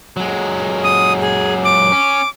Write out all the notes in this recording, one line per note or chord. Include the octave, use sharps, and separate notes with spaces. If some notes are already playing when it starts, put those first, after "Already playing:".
F#3 G#3
D#6
G#4
D6
C#4